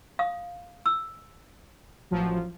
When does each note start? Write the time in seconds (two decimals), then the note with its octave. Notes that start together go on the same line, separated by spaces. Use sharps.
0.19 F5 D#6
0.86 E6
2.11 A1 F3 F#3